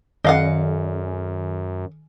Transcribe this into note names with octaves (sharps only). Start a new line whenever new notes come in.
F#2 D#3 D#5 F5 F#5